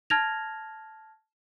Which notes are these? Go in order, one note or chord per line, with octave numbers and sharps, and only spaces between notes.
A5 F6 G#6 A#6 F7